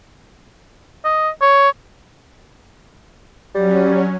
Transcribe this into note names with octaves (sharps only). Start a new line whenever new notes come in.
D#5
C#5
F#3 G3 C#4